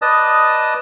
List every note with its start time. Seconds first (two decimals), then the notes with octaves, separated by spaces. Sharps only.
0.02 B4 D5 D#5 A5 D#6